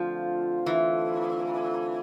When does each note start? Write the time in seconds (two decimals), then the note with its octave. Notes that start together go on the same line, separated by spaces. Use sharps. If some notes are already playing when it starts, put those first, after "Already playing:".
Already playing: D3 F3 A3 C4 F4 A4
0.66 E3